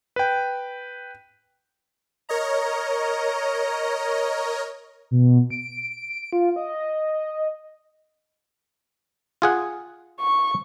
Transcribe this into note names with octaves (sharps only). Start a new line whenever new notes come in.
B4 G5
A#4 C#5 D#5 A#5
B2
D7
F4
D#5
F4 G#4 F#5
C#6